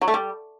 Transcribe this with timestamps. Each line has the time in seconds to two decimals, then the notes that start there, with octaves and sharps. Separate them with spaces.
0.02 F#3
0.08 A3
0.14 G3